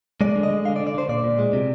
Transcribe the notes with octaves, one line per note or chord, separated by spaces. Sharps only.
G#3 D5
D3
D#5
G#3
D3 F5
D5
D3
D5
D3 C5
A#2 D5
A#2
G#3
C3